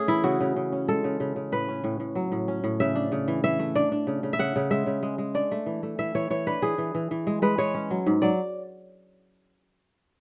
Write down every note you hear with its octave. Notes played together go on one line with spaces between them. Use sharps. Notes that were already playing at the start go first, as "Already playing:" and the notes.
Already playing: A3 C#4 G#4
E3 E4
C#3 F#4
C#3
C#3
C#4
G#3 A4
C#3
C#3
C#3
A2 B4
C#4
A2
A2
F#3
A2
C#4
A2
C#3 E5
D4
C#3
E3
E3 E5
A3
D4 D5
D4
C#3
C#3
E5
C#3 F#5
C#3
G#3 E5
C#3
G#3
G#3
D4 D5
A3
E3
A3
E3 E5
E3 C#5
E3 C#5
D4 B4
E3 G#4
E3
E3
E3
G#3
G#3 B4
G#3 C#5
C#4
F#3
G#2
F#3 D5